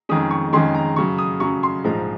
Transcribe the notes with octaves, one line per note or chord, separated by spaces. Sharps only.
F2 D#3 G#3 C#4 D#6
C#6
F2 D#3 G#3 C#4 C6
A#5
F#2 C#3 F#3 C#6
D#6
F#2 C#3 F#3 C#6
C6
A#1 G#2 F3 G#3 D#4 A#5